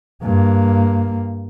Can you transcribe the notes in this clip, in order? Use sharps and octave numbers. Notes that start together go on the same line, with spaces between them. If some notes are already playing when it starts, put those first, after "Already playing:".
G2 A#3